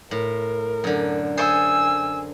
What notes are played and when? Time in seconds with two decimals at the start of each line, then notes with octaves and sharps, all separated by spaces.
0.11 A2 A#4
0.84 F#2 D3
1.37 G#4 A4 C5 G#5 E6